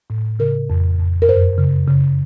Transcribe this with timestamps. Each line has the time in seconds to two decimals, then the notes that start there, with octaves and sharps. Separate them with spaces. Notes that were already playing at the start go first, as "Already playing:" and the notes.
0.10 A2
0.39 C#3 A#4
0.70 F2
1.00 F2
1.22 A#4
1.28 F#2 C5
1.58 C#3
1.88 C#3